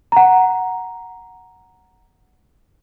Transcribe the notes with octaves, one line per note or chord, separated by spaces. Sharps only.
F#5 A#5